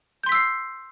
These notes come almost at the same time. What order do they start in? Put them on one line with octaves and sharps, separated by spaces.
G6 C6 B6 E6 C7